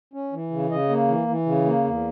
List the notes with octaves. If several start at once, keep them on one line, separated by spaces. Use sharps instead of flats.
C#4
E3
C#3
C#3 D#5
A#3
E3
E3
C#3
A#3
E2